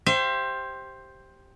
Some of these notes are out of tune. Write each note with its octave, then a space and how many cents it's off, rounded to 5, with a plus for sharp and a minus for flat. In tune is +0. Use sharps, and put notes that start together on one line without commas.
G4 +0 C5 +10 E5 +40